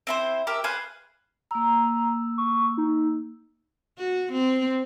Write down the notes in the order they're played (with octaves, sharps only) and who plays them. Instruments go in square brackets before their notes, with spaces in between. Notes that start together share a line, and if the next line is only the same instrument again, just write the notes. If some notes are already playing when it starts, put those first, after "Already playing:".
[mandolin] C4 E4 C5
G4 A#4 E5
G#4 B4 C5 F5
[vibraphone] A#3 E6 [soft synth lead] A#5
[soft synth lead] C#6
D#4
[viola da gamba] F#4
C4